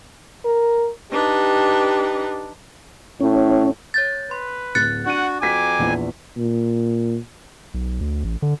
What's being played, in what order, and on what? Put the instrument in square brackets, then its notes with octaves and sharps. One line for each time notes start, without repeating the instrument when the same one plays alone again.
[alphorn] A#4
[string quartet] D4 D#4 B4 [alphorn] G4
[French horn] A2 [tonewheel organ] C#4
[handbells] C#5 G6 A6
[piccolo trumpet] B4 [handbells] C6
[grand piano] D1 [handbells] F#6 A6 C#7
[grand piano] D4 D#7 [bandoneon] F#4 [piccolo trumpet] F#5
[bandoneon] F2 G#5 [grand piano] F#4 B6 [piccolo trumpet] D6
[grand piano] A#1 E2
[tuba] A#2
[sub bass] B1
D2
A1
D3